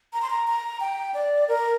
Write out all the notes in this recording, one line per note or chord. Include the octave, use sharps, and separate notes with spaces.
A#5
C6
A#5
A#5
G5
D5
A#4